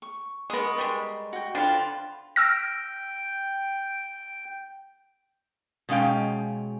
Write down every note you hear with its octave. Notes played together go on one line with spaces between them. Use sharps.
C#6
G#3 B3 A#4 C#6 D#6
G3 G#3
F#4 G5
D3 F4 B4 C5 G5
G5 E6 F6 A#6
B2 G#3 C#4 F5 G5